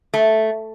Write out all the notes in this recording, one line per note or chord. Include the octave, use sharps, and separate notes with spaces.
A3